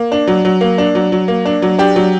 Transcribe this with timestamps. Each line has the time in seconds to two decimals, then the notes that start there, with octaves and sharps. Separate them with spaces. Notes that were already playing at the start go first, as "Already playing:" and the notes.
Already playing: A#3
0.12 D4
0.28 F#3
0.45 F#3
0.61 A#3
0.78 D4
0.95 F#3
1.12 F#3
1.28 A#3
1.45 D4
1.62 F#3
1.79 D4 G4
1.96 F#3